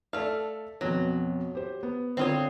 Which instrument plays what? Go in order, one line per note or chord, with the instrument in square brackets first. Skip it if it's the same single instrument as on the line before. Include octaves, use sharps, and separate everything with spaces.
[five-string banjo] A3 F5 [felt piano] A4 D5
[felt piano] F2 B2 [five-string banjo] F#3
[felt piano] G4 C5
B3
[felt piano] D3 D#6 [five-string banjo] C4 F4 C#5